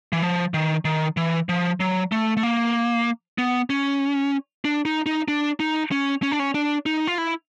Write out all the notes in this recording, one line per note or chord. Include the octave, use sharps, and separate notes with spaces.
E3
F3
D#3
D#3
E3
F3
F#3
A3
A3
A#3
B3
C#4
D4
D#4
D#4
D4
D#4
C#4
C#4
D4
C#4
D4
D#4
F4
E4